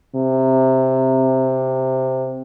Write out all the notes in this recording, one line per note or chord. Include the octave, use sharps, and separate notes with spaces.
C3